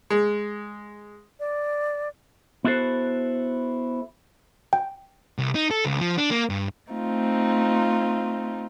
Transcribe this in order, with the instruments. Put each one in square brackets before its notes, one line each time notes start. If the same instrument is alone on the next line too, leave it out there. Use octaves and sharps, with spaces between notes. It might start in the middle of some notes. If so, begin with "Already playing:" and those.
[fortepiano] G#3
[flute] D5
[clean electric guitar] B3 E4 F#4 A4 C5
[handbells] G5
[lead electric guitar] C2
D#4
A4
C#2
F3
D4
A#3
G2
[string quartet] A3 C4 D#4 F4